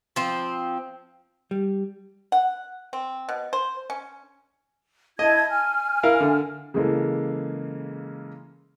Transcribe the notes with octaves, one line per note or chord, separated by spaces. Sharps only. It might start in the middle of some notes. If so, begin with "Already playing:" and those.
F3 C4
G3
F#5
C4
B2
C5
C#4
E4 D#5 A5 G#6
G#5 F6
E4 A#4 F5
D3
C#3 E3 G#3 A#3 A4